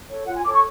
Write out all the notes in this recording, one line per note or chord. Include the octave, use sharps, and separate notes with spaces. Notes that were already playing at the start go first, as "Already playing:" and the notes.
A4 C#5
F4 F#5
G#5
A4 C#5 D6
C#6